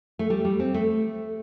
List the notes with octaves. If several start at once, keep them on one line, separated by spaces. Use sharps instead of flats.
A3
G3
G3
C4
A3